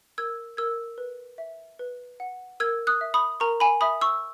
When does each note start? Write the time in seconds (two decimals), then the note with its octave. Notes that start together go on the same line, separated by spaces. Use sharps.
0.18 A#4 E6 G#6
0.57 A#4 E6 G#6
0.98 B4
1.38 E5
1.79 B4
2.20 F#5
2.60 A#4 E6 G#6
2.87 D#6 F#6
3.01 E5
3.14 B5 D#6
3.40 A#4 A#5 C#6
3.60 G#5 B5
3.81 E5 B5 D#6
4.01 C#6 E6